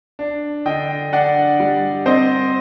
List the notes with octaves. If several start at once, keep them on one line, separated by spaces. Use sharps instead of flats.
D4
D3 D#5 G5
D4 D5 F#5
G3
C4 C5 D#5